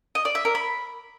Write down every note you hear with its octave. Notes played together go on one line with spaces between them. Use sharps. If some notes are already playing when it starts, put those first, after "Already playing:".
D#5
D5
E5
A#4
B5